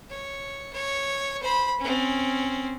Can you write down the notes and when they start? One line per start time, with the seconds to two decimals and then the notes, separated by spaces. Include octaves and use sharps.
0.10 C#5
0.73 C#5
1.43 C5 B5
1.80 C4 C#4